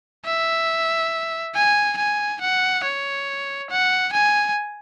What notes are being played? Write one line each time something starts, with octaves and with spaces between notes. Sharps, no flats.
E5
G#5
G#5
F#5
C#5
F#5
G#5